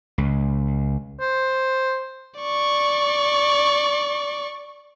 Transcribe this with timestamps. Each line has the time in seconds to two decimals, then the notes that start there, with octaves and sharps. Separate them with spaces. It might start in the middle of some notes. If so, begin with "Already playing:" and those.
0.18 C#2
1.21 C5
2.40 D5 C#6